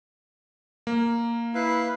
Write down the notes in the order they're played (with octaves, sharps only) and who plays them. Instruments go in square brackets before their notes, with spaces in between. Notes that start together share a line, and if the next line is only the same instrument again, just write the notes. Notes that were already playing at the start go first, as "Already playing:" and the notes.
[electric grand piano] A#3
[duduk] E4 [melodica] B4 F5